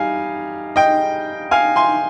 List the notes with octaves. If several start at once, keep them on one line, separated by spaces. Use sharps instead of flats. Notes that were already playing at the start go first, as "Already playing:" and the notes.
Already playing: G3 D#4 F5 G#5
D#5 G5
F5 G#5
G#5 C6